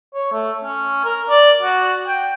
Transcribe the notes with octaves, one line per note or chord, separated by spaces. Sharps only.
C#5
A3
C#4
A#4
D5
F#4
G5